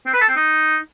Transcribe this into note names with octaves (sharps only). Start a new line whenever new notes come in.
C4
B4
A4
C4
D#4